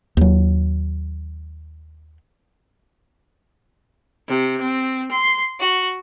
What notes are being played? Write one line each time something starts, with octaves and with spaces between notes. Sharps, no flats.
D#2 F#3
C3
C4
C6
F#4